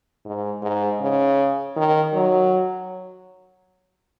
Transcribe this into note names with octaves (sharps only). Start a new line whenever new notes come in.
G#2
G#2
C#3
D#3
F#3